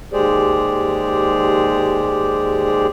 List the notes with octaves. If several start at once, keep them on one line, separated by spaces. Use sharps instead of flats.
D#2 G#3 G4 G#4 C5 D5